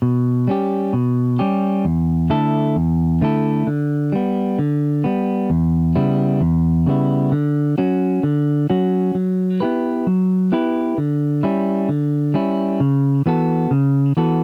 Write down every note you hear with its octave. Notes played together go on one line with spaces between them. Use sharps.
B2
G3 C#4 G4
B2
G3 C#4 G4
E2
D3 A3 E4 A4
E2
D3 A3 E4 A4
D3
G3 B3
D3
G3 B3
E2
C#3 G3 B3 E4
E2
C#3 G3 B3 E4
D3
F#3 C#4 F#4
D3
F#3 C#4 F#4
F#3
B3 E4 G4 B4
F#3
B3 E4 G4 B4
D3
G3 C#4 E4
D3
G3 C#4 E4
C#3
E3 B3 F#4 A4
C#3
E3 B3 F#4 A4